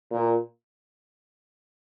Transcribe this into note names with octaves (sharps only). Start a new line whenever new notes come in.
A#2